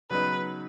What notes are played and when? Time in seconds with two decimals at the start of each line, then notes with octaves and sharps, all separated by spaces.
0.10 C#3 F#3 B3 D#4 B4